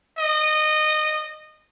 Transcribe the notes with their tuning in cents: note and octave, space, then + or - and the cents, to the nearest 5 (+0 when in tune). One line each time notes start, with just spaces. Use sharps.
D#5 -20